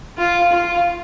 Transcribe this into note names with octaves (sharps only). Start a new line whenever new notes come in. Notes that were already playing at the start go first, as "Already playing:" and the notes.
F4
F4